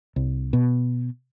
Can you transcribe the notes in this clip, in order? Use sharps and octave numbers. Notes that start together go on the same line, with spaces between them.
C2
B2